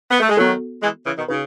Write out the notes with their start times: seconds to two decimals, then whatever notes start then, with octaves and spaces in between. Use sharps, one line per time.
0.11 B3
0.20 A3
0.29 G#3
0.37 D#3 F#3 B3 F#4 A4
0.83 E3 G#3
1.05 C#3 E3
1.17 B2 D#3
1.28 C#3 D#4 F#4 B4